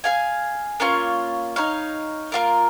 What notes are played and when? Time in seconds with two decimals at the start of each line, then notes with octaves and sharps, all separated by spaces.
0.04 G#4 F5 G#5
0.80 A#3 C#4 F4 C#5
1.56 D#4 C#5 F5
2.32 A#3 F4 A#4